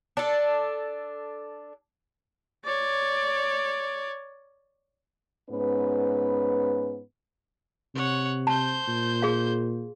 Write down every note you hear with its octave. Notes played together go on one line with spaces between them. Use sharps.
D4 A4
C#5 D5
G#2 B3 C#4 B4
C3 C#5 F#5
C5 A5 G6
A#2
G#4 F5